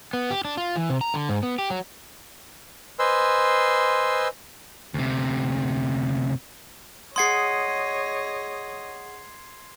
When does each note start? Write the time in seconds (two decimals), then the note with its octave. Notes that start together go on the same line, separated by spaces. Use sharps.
0.13 B3
0.30 G4
0.45 D4
0.57 F4
0.76 E3
0.90 C3
1.01 A#5
1.14 D3
1.29 G#2
1.43 B3
1.58 G4
1.70 F#3
2.99 B4 C5 D#5 G#5 C6 E6
4.94 D2 C3
7.16 G#4 C#5 D#5 F#5 C6 D#6 G#6 C7